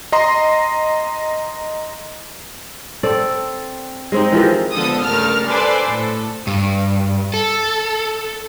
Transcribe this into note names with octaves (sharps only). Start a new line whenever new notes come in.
D#5 A#5 C6
C4 A4 D5
G#3 C4 D#4
E3 F3 G4 A#4
D3 F3 G#3 B3 A4 D#6
G2 C#3 A3 A#4 A5 F6
D4 A4 B4 C5 D5 G#5
A2 A4
G2
A4